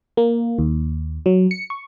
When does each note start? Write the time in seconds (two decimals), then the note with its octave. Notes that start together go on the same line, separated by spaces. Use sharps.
0.17 A#3
0.59 D#2
1.26 F#3
1.51 C#7
1.70 C#6